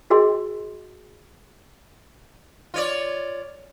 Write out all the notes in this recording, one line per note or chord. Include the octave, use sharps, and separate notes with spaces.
F#4 G#4 A#4 D#5 C6
F4 C#5 D5